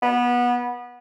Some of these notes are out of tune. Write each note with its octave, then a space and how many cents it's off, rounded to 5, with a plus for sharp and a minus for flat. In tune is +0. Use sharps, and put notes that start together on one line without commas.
B3 -20